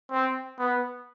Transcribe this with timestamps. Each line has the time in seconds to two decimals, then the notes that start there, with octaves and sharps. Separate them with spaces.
0.11 C4
0.59 B3